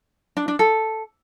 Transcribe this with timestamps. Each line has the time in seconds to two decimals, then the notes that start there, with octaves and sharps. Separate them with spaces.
0.37 D4
0.48 D4
0.59 A4